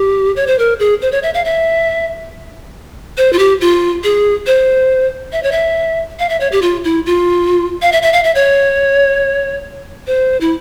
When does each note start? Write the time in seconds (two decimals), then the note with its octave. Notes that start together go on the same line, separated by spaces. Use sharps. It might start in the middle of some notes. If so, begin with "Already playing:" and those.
Already playing: G4
0.36 C#5
0.47 C5
0.59 A#4
0.80 G#4
1.02 C5
1.12 C#5
1.23 E5
1.34 F5
1.45 E5
3.17 C5
3.33 F4
3.39 G4
3.61 F4
4.04 G#4
4.47 C5
5.32 E5
5.43 C#5
5.52 E5
6.19 F5
6.29 E5
6.40 C#5
6.52 G4
6.62 F4
6.84 E4
7.06 F4
7.82 F5
7.92 E5
8.02 E5
8.13 F5
8.24 E5
8.35 C#5
10.07 C5
10.41 E4